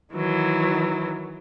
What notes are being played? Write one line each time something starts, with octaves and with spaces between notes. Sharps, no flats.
D#3 E3 F#3